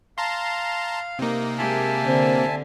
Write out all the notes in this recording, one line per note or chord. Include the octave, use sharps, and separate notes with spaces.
F5 A5 A#5 C6
C3 A#3 D#4
G#3 G4 E5 G#5 A5
D3 C4